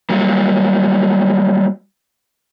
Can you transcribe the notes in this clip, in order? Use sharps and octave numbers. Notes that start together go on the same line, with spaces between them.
F#3 G3 A#3